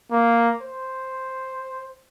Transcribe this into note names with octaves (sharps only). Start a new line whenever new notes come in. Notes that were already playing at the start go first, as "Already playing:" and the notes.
A#3
C5